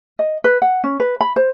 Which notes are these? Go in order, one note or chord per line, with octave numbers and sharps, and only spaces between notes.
D#5
B4
F#5
C#4
B4
B5
C5